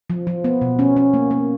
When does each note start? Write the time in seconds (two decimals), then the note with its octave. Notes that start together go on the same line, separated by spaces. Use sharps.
0.10 F3
0.27 F3
0.44 B3
0.61 B2
0.79 C#4
0.97 C#4
1.14 A#3
1.31 A#3